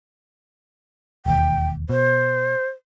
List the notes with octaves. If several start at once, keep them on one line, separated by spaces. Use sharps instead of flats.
E1 D#2 G5
B2 C5